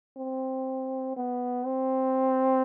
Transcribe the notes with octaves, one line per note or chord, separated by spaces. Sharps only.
C4
B3
C4